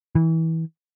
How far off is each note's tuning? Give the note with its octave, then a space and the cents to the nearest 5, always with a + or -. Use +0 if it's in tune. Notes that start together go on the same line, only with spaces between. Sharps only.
E3 -25